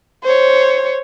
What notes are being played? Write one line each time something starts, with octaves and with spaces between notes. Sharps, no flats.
C5 C#5